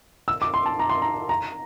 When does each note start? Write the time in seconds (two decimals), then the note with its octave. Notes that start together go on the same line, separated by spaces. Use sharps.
0.28 E6
0.42 D6
0.54 C6
0.66 A5
0.79 A#5
0.90 C6
1.02 A#5
1.29 A#5